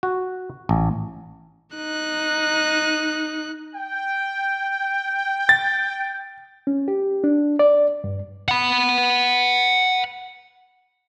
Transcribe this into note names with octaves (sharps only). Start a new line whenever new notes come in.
F#4
A1
D#4 F#6
G5
A6
C#4
G4
D4
D5
G2
F#5 B5